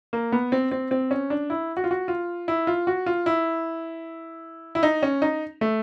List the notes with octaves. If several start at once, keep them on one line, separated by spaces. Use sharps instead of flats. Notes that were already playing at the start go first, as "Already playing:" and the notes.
A#3
B3
C4
C4
C4
C#4
D4
E4
F#4
F4
F#4
F4
E4
F4
F#4
F4
E4
E4
D#4
C#4
D#4
A3